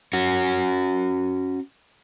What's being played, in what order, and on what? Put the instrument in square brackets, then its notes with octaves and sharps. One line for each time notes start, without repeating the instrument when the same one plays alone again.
[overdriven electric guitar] C#4 F#4